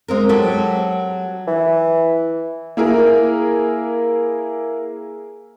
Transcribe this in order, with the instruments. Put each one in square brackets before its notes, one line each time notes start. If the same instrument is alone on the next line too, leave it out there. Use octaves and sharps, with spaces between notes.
[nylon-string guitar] G#3 C4 A#4
F#3 G4 A4
[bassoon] E3
[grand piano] A#3 E4 G#4 A#4